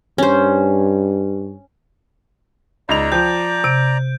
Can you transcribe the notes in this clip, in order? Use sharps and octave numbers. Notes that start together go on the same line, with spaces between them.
G2 C#4 C5
C#2 D#4 D5 A#5 F7
F3 G5 G6
C3 D7